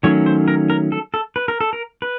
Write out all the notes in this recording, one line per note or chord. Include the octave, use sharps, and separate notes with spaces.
D#3 F#3 A3 C#4 C#5
C5
A#4
A#4
A4
A4
B4
A#4
A4
A#4
B4